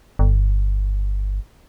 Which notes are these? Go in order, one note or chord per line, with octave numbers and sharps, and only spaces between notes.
G1